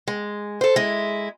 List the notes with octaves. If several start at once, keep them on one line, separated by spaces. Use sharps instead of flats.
G#3
A4 C5
G#3 E4